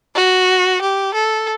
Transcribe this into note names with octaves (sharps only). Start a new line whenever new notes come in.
F#4
G4
A4